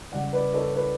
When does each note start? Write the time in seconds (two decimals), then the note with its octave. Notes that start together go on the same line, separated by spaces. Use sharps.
0.12 C#3 G3 D5 F#5
0.33 B4 D5
0.54 A4 C#5
0.76 B4 D5